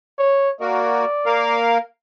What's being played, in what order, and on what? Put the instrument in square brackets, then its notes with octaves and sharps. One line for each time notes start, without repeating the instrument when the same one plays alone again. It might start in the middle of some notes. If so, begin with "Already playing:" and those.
[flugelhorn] C#5
[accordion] A#3 F#4 A#4 [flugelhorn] D5
[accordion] A#3 A#4 F5